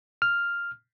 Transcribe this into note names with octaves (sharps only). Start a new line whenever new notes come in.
F6